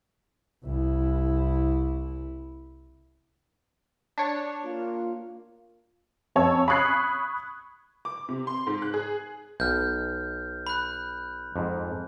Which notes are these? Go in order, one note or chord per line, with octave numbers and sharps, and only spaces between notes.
C2 E4
D4 C#5
A#3 F4
F2 C#5 A5 E6
B5 C#6 D#6 F#6 G#6 C7
D6
C3
C6
G#2
F#6
G#4
B1 F6 G6
B5 F#6
F2 G#2